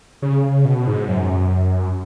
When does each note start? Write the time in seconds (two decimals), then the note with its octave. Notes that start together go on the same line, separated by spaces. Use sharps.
0.22 C#3
0.65 B2
0.87 G#2
1.08 F#2